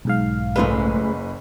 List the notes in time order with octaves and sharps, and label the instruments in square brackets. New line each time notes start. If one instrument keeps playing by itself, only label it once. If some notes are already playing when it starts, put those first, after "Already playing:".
[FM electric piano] B1 G#2 F5
[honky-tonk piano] F#1 B4 [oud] G#3 A3 F4